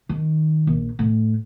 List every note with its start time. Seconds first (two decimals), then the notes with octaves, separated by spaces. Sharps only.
0.09 D#3
0.67 A#1
0.99 A2